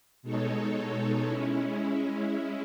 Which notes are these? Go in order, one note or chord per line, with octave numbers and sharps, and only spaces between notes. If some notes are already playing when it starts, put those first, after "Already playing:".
B2 G#3 D#4 A4 C#5
G#3 C#4 E4